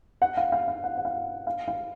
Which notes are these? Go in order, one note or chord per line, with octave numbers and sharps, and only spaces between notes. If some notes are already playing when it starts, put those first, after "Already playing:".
F#5
F5
F5
F5
F#5
F#5
F5
F5
F5